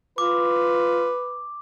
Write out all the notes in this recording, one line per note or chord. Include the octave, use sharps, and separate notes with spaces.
F4 B4 D6